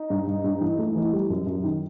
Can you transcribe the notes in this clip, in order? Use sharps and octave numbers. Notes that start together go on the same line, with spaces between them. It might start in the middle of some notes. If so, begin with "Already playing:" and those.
Already playing: D#4
G2
G2
G2
E3
A3
E3
G3
F#2
F#2
D#3